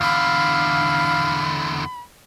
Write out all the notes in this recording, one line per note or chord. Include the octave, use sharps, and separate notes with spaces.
E2 D3 F5 B5